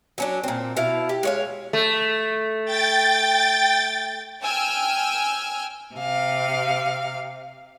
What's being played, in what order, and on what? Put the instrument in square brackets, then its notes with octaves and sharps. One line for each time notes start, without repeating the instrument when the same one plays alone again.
[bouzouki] F#3 C#4 D4
A#2 C4
B2 E4 F5
G4
G#3 C#5 F5
[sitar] A3
[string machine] G5 A6
[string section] G5 G#5 E6 F6
[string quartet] C3 F5